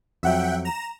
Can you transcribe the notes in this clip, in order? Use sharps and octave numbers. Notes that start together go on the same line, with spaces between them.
F2 F#3 E5 F#5 G5
A#5 E7